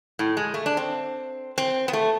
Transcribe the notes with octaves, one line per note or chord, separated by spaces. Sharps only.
A2
G#3
A3
D4
C4
C4
B3
A3